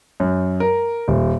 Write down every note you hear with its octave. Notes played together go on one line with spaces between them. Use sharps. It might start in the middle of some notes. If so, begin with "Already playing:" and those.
F#2
A#4
D#1